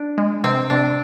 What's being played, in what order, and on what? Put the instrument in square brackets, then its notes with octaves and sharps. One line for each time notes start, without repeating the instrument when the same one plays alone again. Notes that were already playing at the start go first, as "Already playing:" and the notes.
Already playing: [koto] D4
[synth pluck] G#3
[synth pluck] C3 [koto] C4
[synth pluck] C3 [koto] D4